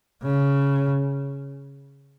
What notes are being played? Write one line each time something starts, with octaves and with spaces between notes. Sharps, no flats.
C#3